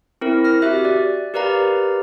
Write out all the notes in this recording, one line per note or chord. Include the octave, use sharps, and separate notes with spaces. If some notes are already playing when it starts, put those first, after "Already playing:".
C4 E4 A#4
F6 A#6
F#4 G4 E5 F#6
D5
G4 A#4 B4 D5 F5 A#5